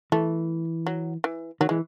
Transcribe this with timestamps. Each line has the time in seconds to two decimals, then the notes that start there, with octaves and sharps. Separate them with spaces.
0.12 E3 A3
0.86 F#3
1.24 E3
1.61 D#3 F#3
1.69 E3 G#3